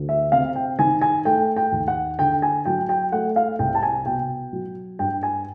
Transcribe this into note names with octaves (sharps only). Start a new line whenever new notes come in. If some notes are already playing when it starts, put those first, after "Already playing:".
Already playing: D2
E5
C3 F5
G5
D#3 G#5
G#5
A3 G5
G5
D#2
F#5
D3 G5
G#5
F#3 G5
G5
A3 F#5
F5
C2 G5
A5
G#5
B2 G5
F#3
G2 G5
G#5